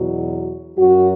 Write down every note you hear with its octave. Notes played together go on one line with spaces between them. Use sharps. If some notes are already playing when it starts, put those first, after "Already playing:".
Already playing: E2 B2 F#3
F#2 F#3 F#4